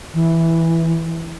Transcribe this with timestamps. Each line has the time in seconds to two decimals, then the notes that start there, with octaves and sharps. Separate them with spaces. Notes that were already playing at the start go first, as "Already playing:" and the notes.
0.14 E3